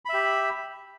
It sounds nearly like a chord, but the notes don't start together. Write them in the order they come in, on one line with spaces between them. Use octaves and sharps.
B5 E5 G4